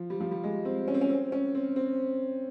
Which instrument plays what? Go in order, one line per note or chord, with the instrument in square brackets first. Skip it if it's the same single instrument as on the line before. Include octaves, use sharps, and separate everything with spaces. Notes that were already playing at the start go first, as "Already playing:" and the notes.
Already playing: [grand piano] F3
G3
F3
G3
G#3
C4
C#4
C4
C#4
C4
C#4
C4
C4